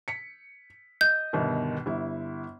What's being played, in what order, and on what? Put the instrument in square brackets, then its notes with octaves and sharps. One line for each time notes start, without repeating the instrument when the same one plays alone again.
[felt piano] B6 C#7
[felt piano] D#5 [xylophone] G6
[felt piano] G1 B2 D#3
G1 E4